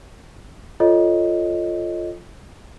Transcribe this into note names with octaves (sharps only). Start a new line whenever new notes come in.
F4 A4 C#5 D#5